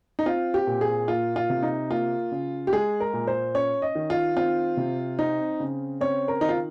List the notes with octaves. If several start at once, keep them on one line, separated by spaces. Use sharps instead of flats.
D#4
C4 F4
G4
A#2
G#4
A#3 F4
F4
C3
D#4
A#3 F4
C#3
G4
G#3 G#4
A#4
A#2
C5
C#4 C#5
D#5
D#3
F4
C4 F4
C3
C4 D#4
C#3
C4 C#5
A#4
D#3 D#4
F4